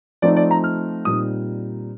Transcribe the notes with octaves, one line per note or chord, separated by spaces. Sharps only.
F3 A3 C4 D#4 D5
D5
A#5
F6
A#2 G3 C4 D#4 D#6